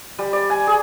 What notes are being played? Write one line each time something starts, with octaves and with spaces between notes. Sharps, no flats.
G3
D5
G#5
G#4